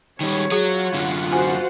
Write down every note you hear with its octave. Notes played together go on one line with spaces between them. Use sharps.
D#3 G3 G#3 C#5
F#3 F4 G#4 F#5
F#2 D3
F#4 C5 G#5